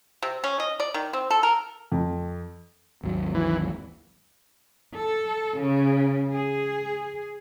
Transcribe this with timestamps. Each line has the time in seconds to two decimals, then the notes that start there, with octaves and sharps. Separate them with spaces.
0.22 C3
0.44 C#4
0.60 D#5
0.80 D5
0.94 D#3
1.13 C4
1.30 A4
1.43 A#4
1.92 F2
3.04 G#1 D#2 F#3
3.35 E3
4.97 A4
5.61 C#3
6.30 G#4